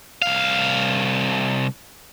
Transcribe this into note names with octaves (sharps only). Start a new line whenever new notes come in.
C2 F5